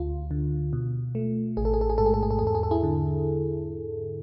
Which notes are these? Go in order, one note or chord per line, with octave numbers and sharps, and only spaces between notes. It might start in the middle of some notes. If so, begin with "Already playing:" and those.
Already playing: D2 F4
D3
B2
A3
A1 G#4
A4
G#4
A4
G#4
G#2 A4
G#4
A4
G#4
A4
E2 G#4
A4
G#4
A4
E4 G#4
D3